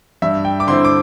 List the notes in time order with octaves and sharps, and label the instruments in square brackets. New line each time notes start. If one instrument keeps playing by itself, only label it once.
[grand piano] G2 E5
G5
D6
D3 C4 E4 C6
D6